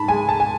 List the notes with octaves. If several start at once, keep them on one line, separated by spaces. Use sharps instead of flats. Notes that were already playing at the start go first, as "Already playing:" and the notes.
Already playing: G#2 A5 B5
G#3 G#5
A5
G#5